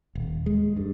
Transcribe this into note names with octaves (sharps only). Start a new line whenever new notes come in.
D#1
G#3
G2